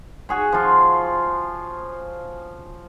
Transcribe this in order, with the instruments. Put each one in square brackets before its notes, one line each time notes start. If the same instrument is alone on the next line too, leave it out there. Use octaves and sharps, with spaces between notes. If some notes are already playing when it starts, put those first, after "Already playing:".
[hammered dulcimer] F#4 G#4 C#5
F3 F4